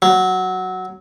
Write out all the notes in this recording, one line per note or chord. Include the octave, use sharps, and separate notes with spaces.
F#3